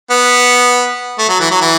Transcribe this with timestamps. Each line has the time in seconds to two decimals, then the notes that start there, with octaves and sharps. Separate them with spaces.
0.10 B3
1.19 A3
1.29 F#3
1.40 E3
1.51 F#3
1.61 E3